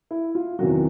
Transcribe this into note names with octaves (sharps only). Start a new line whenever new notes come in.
E4
F4
E2 C3 D#3 F#3 F#4